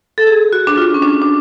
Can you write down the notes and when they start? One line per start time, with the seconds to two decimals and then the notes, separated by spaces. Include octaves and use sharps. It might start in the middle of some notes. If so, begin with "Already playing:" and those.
0.18 A4
0.27 G#4
0.53 F#4
0.67 D4
0.77 F4
0.94 C#4
1.02 D4
1.22 D4